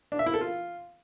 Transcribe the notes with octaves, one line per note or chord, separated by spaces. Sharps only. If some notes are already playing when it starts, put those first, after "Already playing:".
D4
E5
E4
A4
F4